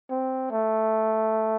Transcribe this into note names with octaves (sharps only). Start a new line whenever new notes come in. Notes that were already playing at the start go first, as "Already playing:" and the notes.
C4
A3